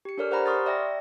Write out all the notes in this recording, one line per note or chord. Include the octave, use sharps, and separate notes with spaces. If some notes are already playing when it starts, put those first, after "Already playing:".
G4 C#7
D4 A4 A#4 C#5 D5 F6
G4 C5 F#5 G#5 A#5 B5
C6 C#6 D#6 F6 A6
D5 E5 G5 A#6